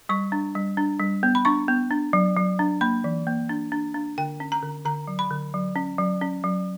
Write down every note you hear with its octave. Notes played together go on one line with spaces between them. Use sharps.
G3 C#6
D4
G3
D4
G3
B3
B5
D4 C#6
B3
D4
F#3
F#3
D4
A#3 B5
E3
A#3
D4
D4
D4
D3 G5
C#4
A#5
D3
D3 A#5
F#3
B5
D3
F#3
C#4
F#3
C#4
F#3